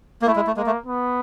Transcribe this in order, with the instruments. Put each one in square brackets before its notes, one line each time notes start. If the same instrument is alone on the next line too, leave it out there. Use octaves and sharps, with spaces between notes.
[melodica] A#3
[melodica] A3 [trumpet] E4
[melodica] G#3
A3
[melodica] G#3 [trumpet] A#3
[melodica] A3
[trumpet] B3